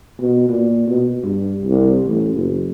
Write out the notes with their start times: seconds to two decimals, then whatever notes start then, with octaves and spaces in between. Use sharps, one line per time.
0.20 B2
0.49 A#2
0.87 B2
1.24 G2
1.62 C2
2.04 A1
2.34 F#1